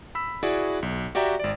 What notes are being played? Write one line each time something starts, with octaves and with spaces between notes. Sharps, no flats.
B5 E6 B6
E4 F#4 G#4 D5
B1
F#4 G4 D5 E5 G5 A#5
G#1 D5